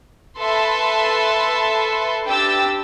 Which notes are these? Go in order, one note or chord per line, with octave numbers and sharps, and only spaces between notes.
A4 B4 E5 A5 C6
D4 G4 B4 G5 E6 A6